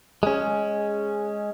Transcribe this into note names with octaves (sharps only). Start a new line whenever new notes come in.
G#3 C#4